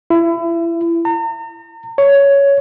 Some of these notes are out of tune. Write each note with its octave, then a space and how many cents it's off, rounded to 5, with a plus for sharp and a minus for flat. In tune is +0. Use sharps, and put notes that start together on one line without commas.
E4 +30
A#5 -40
C#5 +10